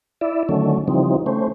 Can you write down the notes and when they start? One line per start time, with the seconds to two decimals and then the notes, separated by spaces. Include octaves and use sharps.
0.21 E4 D5 E5
0.49 D3 D#3 F#3 A3 C#4
0.88 C#3 E3 F3 G3 C4 D#4
1.26 A3 C#4 C5